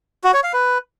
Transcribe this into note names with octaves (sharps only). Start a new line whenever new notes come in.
F#4
C#5
F5
B4